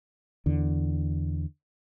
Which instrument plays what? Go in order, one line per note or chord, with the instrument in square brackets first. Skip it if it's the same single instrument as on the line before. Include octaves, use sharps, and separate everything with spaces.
[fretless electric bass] E2 D3